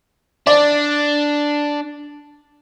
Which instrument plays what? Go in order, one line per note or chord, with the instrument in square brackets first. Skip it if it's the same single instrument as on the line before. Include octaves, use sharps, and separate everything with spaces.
[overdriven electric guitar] D4 [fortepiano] D5